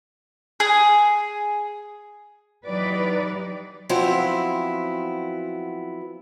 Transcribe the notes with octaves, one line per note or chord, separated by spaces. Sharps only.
G#4
E3 F#3 D#4 G4 B4 D5
F3 F#3 B3 C4 E4